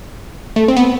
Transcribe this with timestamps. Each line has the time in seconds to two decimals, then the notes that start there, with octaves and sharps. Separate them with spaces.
0.56 A3
0.68 C4
0.77 B3